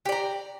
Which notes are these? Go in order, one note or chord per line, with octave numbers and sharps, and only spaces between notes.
G4 D5 A#5